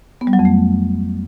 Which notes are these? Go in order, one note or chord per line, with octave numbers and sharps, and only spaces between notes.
B3
G3
F#3
F2
A3